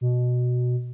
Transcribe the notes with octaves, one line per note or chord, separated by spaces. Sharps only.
B2